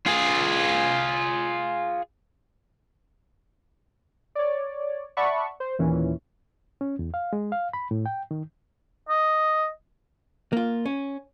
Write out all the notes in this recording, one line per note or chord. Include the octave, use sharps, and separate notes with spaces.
F4 G#4
C#5 D5
D5 E5 F#5 A5 B5 C#6
C5
D#2 A#2 E3 C#4
C#4
E2
F5
G#3
F5
B5
A2
G5
D#3
D#5
A#3 F4
C#4